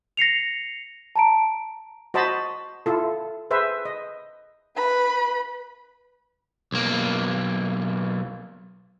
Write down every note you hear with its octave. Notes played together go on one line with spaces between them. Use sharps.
A#6 C7 C#7 F7
A5 A#5 D7
F#4 C5 D#5 A5 B5
E4 F4 A4
G#4 B4 C5 E5
D#5
B4 B5
B1 A#3